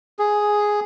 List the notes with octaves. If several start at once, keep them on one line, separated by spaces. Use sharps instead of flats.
G#4